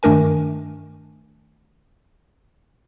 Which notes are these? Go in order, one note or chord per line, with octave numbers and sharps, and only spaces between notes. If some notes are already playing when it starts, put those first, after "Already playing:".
G2 D#3 A3 D4 A#4 G#5